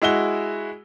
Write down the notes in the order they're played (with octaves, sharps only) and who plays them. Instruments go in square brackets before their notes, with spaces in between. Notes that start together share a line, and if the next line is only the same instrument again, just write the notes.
[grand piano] G#3 E4 F#4 G7